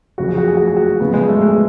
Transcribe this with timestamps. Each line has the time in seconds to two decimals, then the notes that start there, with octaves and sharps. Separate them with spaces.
0.18 F#1 F2 C#3 F#4
0.29 G#4
0.38 F#4
0.48 G#4
0.57 F#4
0.67 G#4
0.76 F#4
1.00 F2 C#3 F#3 B3
1.14 G#3
1.28 A3
1.42 G#3